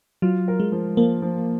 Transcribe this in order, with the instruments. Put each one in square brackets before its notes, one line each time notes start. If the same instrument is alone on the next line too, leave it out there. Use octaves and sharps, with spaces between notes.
[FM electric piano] F#3 [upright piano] F4
[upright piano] A#4
[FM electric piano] G#3
[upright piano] F3
[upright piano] F3 [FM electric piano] A#3
[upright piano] F3